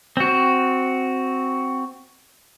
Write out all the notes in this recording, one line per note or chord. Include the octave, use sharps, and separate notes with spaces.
C4 F#4